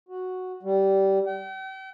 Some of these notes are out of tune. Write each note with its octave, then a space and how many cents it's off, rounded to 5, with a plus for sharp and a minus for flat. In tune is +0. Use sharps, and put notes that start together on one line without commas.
F#4 -5
G3 -15
G5 -40